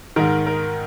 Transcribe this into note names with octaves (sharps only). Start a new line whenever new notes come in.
G#2 D#3 A#4
A#4